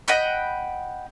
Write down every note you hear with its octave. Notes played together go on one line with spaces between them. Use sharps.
D#5 F#5 G5 B5